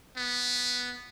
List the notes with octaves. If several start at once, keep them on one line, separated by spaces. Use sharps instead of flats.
B3